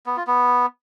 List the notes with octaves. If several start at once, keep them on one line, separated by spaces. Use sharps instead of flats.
B3
F4
B3